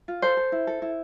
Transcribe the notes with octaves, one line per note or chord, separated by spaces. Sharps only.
F4
A4 C5
A4
E4
A4
E4